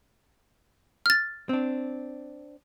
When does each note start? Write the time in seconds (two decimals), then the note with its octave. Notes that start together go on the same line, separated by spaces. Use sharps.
1.06 F6 A6
1.49 C4 D4